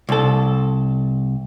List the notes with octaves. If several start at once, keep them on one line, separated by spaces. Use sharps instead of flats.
C2 A4